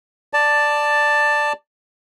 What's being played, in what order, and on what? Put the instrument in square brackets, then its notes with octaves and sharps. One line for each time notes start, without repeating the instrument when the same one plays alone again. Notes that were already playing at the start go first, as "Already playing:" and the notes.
[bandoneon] D5 A5